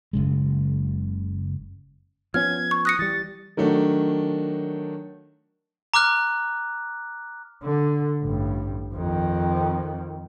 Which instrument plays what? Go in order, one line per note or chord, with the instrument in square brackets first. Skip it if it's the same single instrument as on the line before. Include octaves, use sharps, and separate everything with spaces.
[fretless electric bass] F#1 C#3 G#3
[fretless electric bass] F3 B3 C#4 [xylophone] F6 [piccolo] G#6
[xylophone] C#6
[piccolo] D#6 [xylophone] F#6 A#6 C#7
[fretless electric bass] E3 G3 [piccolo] A6
[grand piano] D#3 F#3 A3 D4
[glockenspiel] A#5 D6 F6 F#6
[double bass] D3
A1 G2
F2 D#3